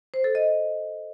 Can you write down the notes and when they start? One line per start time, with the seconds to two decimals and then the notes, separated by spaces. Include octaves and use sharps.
0.14 C5
0.24 A4
0.35 D#5